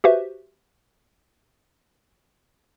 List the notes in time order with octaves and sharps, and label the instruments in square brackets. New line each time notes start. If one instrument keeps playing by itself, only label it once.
[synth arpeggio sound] F#4 G4 B4 C5 E5